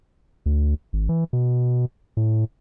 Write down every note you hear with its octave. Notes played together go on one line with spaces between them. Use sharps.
D2
G#1
E3
B2
A2